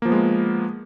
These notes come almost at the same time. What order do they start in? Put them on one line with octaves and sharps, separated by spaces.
A#3 F3 B3 G#3